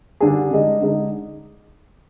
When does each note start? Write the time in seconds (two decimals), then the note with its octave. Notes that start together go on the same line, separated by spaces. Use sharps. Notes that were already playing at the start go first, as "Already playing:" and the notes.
0.21 D3 G3 D4 G#4
0.51 D3 G#3 D#4
0.81 D3 G#3 D#4